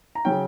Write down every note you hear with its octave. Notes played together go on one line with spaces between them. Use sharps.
A#5
C#3 F#3 C#4 G5